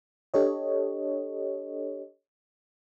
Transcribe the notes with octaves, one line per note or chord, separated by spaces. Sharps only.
D4 G4 A4 C#5 D#5